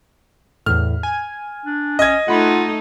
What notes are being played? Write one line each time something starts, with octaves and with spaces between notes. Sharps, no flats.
E2 A2 F6
G#5
D4
C#4 D#5 G#6
A3 D#4 F4 F#5 B5